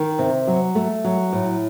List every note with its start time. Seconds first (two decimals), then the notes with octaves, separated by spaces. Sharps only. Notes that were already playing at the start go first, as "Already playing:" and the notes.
Already playing: D#3
0.19 C3
0.47 F#3
0.75 A3
1.04 F#3
1.33 A2